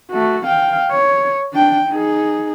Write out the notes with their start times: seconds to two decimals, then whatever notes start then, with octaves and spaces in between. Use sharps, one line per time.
0.11 A3 F#4
0.46 F5 G5
0.91 C#5
1.53 D4 G5
1.89 D#4 G#4